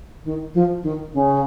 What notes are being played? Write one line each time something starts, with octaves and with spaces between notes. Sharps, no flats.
D#3
F3
D#3
C#3